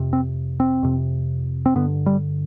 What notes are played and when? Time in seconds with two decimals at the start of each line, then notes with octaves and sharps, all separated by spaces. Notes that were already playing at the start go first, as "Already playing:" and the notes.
Already playing: F2 C3
0.13 C4
0.60 C4
0.83 F2 C3
1.66 C4
1.75 G2 D3 B3
2.06 G3